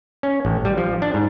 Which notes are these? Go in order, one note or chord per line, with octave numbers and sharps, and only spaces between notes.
C#4
A1
G3
F3
D4
G#2